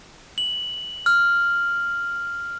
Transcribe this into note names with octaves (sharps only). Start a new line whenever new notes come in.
F#7
F6